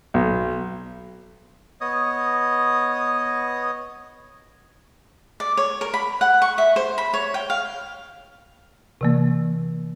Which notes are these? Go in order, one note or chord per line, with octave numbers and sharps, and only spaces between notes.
B1
B3 C#5 D#5 D#6
D5
C#5
A#4
B5
F#5
C#6
E5
C5
B5
C#5
G5
F5
C3 E3 A#3